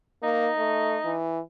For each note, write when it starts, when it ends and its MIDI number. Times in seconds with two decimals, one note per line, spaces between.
0.23 0.49 58
0.23 1.15 63
0.58 0.97 57
1.05 1.40 52